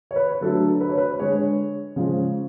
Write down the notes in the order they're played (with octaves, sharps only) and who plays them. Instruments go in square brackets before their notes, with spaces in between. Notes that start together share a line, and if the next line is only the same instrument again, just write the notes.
[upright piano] C#5
B4
D3 F#3 A3 A4
B4
C#5
B4
D3 G#3 C#5
C#3 F3 G#3